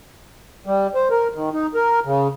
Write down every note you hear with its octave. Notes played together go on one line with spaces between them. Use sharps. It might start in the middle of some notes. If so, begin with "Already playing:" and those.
G3
C5
A#4
D#3
D#4
A#4
C#3